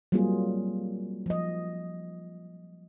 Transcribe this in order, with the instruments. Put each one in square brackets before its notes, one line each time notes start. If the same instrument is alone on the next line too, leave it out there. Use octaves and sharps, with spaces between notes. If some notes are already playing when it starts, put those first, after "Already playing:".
[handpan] F#3 G3 A#3 C4 F4 G#4
F3 D#5